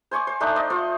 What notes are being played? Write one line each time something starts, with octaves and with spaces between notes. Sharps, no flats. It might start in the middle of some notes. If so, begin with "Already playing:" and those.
C5 G#5 C#6 D6
C5
A3 D4 D#4
D5 D#5
F4 C5 C#6